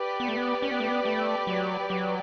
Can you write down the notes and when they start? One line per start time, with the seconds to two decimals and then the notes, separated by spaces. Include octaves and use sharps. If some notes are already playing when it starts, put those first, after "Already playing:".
Already playing: G4 B4 D5
0.20 B3
0.28 A3
0.37 B3
0.62 C#4
0.71 B3
0.80 A3
0.89 B3
1.05 A3
1.47 F#3
1.90 F#3